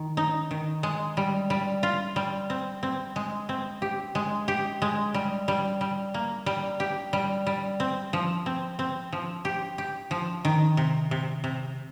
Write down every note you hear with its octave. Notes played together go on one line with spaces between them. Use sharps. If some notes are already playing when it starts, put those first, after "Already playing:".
Already playing: D#3
D#4
D#3
G#3
G3
G3
F4
G3
C4
C4
G#3
C4
G4
G#3
G4
G#3
G3
G3
G3
A#3
G3
G4
G3
G3
C4
F3
C4
C4
F3
G4
G4
F3
D#3
C3
C3
C3